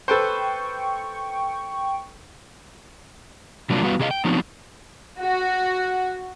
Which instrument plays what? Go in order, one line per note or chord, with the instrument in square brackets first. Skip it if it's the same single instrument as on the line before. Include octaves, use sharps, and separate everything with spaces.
[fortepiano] A4 B4 C5 [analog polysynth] G5 C#6
[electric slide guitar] C3 F#3 G3 A#3 D4 F4
G3 B3 F#4 B4 F5
C3 G#4 D#5 F5
G5
F3 F#3 B3 C4 D4 D#4
[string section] F#4